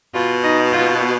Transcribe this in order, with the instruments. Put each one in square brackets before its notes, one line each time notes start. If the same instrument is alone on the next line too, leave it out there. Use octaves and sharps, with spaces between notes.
[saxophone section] B2 [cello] F4
[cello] D#4
F4